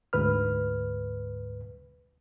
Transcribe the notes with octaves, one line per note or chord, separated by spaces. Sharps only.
D2 G#2 B4 F6